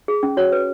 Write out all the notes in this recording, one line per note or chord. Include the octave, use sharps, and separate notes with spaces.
G#4
C#4
F#4 C#5
B4